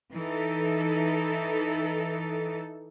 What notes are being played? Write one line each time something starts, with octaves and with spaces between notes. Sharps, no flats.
E3 D#4 A4